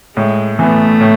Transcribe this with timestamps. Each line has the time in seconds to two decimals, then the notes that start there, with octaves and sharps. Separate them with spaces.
0.16 A2 G#3
0.58 E3 A3 B3
1.01 A2